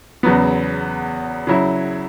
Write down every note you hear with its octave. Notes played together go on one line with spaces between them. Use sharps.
E2 C#3 F#3 B3
C#3 F#3 E4